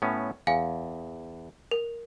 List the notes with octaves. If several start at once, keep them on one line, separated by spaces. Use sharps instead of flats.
A2 B3 C#4
E2 F5 G#5
A#4